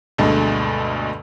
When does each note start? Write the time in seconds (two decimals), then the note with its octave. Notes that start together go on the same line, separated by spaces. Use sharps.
0.18 D2 G2 B2 G#3 A3